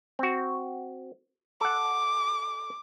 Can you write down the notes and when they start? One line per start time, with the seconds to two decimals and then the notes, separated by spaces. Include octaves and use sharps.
0.19 C4 F#4
1.61 A4 F#5 D6